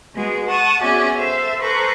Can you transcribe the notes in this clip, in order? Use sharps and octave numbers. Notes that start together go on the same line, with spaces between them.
G#3 B3 F#4 G#4
F#5 A5 C#6 D#6
B3 C#4 F#4 G#4 D5 E5
A4 C5 E5 F5
A4 B4 C5 A#5 C#6 F#6